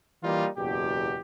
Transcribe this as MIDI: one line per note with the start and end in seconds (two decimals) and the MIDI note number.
0.23 0.48 52
0.23 0.48 55
0.23 0.48 58
0.23 0.48 63
0.23 0.48 65
0.57 1.21 30
0.57 1.21 40
0.57 1.21 47
0.57 1.21 67